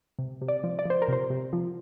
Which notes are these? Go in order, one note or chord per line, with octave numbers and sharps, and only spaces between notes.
C3
C3
D5
F3
D5
F3 C5
A#4
C3 C5
C3
F3